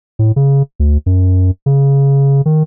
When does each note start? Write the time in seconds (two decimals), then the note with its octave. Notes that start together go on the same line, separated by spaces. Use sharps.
0.19 A2
0.36 C#3
0.80 D2
1.06 F#2
1.66 C#3
2.46 D#3